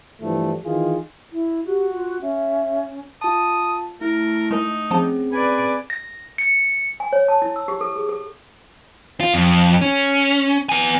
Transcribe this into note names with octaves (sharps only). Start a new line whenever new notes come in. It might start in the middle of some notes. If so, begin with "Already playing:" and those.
G2 E3 F3 A3
D#3 E3 F4 G#4
E4
F#4 G4
F4
C#4 E5
F4 A5 D#6
A3 E4 A#4
G#3 D#4 A#4
F3 C4 C#4 G#4 A5
B4 D5 G#5
A#6
C#7
G#5
C#5
A5
E4
E6
G4
A4
G#4
A4
F4
F2
C#4
B3 G#5